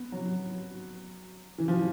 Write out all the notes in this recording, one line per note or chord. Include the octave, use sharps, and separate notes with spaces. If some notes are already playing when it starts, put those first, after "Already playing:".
Already playing: B3
F#3
E3
F3